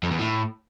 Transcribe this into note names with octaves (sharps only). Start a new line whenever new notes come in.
F2
E2
A2